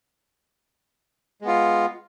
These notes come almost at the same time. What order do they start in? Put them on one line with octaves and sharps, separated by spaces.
G#3 B3 F4